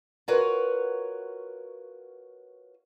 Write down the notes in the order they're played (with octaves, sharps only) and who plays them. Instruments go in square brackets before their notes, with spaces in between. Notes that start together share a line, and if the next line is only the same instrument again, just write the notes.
[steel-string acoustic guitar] F4 F#4 A#4 B4 C#5